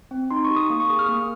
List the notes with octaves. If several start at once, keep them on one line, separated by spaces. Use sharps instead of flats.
C4
D#4 C6
C#6
G4
D#6
A#3
C#6
G#4 D#6
F6
A#3